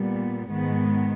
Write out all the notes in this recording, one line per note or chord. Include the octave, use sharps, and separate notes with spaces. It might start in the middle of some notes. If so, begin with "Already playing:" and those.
Already playing: A#2 G3 B3
G#2 D#3 G#3 B3